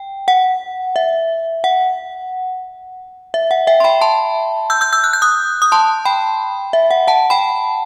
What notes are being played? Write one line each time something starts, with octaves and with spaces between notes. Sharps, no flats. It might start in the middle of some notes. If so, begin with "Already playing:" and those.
Already playing: G5
F#5
E5
F#5
E5
F#5
E5 G5
C6
G5 B5
A5 C6
E6 G6
E6 G6
E6 G6
F#6
G6
D#6 F#6
D#6
A5 C6
G5 B5
E5
F#5
F#5 A5
G5 B5